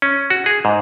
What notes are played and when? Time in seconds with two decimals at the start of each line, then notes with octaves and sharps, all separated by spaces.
0.02 C#4
0.30 F#4
0.46 G#4
0.65 G#2